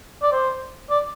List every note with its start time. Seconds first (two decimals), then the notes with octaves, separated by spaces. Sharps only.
0.23 D5
0.32 C5
0.90 D5